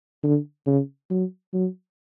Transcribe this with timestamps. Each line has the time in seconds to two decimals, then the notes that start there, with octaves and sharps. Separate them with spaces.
0.23 D3
0.66 C#3
1.10 F#3
1.53 F#3